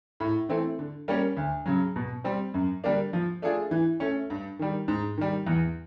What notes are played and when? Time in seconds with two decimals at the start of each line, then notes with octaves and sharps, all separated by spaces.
0.20 A2
0.49 E3 A3 C4
0.79 D3
1.08 G3 A#3 C#4
1.37 D2
1.66 C#3 F#3
1.96 B2
2.24 G3 C4
2.54 F#2
2.84 D3 G3 A#3 D4
3.13 F3
3.42 A3 D4 F4 G#4
3.71 E3
4.00 A3 C#4
4.30 G2
4.59 D#3 G3
4.88 G#2
5.17 D#3 G3
5.47 E2